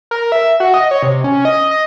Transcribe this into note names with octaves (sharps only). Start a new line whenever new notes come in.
A#4
E5
F#4
D#5
C#5
C3
C#4
D#5
D#5